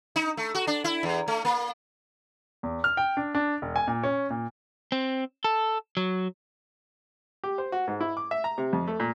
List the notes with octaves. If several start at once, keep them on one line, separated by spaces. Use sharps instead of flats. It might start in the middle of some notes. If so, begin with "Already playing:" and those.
D#4
A3
F#4
D4
E4
E2
A3
A#3
E2
F6
G5
D4
D4
E1
G#5
A#2
C#4
A#2
C4
A4
F#3
G4
C5
F#4
G#2
E4
D6
E5
A#5
C3
F2
A3
A#2